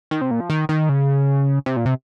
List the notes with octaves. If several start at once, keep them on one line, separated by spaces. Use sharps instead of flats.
D#3
C3
A#2
F3
D#3
D#3
C#3
C3
A#2
C3